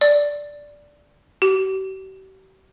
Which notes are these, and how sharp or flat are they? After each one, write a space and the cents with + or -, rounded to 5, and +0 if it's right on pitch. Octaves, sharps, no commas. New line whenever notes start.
D5 -5
G4 -45